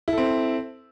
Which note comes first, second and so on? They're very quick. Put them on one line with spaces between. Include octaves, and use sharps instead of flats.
E4 A4 C4